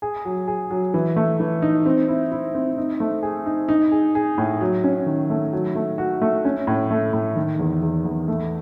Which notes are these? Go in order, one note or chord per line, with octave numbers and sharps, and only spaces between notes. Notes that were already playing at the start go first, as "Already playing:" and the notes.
G#4
F#3
G#4
F#3
E3
A3
E3
D#4
C4
E4
E4
C4
D#4
A3
G#4
D#4
D#4
G#4
G#4
A2
F#3
C#4
D#3
A3
F#3
A3
F#4
A3
C#4
A2
A3
A2
D#3
E2
E2
E2
A3